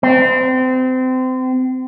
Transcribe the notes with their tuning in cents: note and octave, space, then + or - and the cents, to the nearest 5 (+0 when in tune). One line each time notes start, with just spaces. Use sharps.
C4 -30